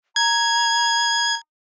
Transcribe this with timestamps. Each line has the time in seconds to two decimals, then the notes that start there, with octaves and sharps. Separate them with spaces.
0.16 A#5 G#6